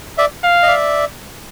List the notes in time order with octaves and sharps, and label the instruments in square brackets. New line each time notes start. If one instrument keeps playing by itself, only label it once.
[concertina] D5 E5
[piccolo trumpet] F5
[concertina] D#5
D5 E5